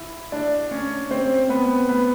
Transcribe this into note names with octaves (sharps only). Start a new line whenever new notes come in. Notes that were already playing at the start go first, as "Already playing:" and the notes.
Already playing: E4
D4 D5
C#4 C#5
C4 C5
B3 B4
B3 B4